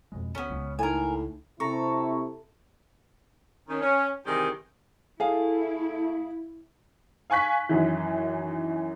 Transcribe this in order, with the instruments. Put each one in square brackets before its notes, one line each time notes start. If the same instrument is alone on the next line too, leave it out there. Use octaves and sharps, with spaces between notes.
[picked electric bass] F2 B2 G#3
[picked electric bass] D2 [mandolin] B3 C#4
[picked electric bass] C#2 C#3 G#3
[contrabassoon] A2 [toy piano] D#4 A4 [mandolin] A#4 G#5
[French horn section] C3 [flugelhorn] E4 [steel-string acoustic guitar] A4 [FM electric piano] A#5 C#6
[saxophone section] D#3 C#4
C#4
C3 D#3 E3 G3 G4 G#4
[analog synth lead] A3 [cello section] E4 [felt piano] G#4 F5
[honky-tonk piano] F5 G#5 C#6 F#6 B6
F#2 D#3 E3